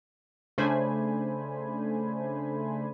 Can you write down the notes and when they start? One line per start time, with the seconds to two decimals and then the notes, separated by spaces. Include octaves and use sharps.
0.58 C#3 A3 D4 C5 G#5 B5